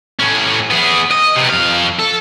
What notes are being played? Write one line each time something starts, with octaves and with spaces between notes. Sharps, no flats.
A2 C#4
B3 G#4
D#5
C3 B3
F2 F5
A4